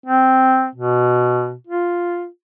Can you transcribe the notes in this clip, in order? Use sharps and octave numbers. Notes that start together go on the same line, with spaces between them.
C4
B2
F4